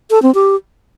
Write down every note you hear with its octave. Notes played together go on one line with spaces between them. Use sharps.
A4
C4
G4